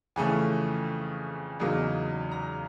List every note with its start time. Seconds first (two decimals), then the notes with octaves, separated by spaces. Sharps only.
0.16 F2 C#3 E3 A3 C#4 G#5
1.59 E2 C#3 F#3 A#3 D#4
2.31 A#5